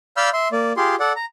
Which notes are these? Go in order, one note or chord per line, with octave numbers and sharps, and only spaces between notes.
D5 F5 B5 E6 F6 G6
E5 C6
A#3 D5
F4 G4 G#4 C6
A4 D5 F#5
A#5